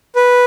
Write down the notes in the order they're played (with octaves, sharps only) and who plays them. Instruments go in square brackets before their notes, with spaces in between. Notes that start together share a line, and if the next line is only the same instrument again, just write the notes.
[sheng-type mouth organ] B4